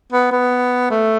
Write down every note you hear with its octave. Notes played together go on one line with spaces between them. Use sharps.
B3
B3
A3